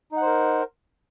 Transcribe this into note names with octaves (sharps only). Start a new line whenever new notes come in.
D#4 A#4 C5 F#5